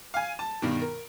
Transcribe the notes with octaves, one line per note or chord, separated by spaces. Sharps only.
F5 G#5
A5
G2 B2 D#3
A#4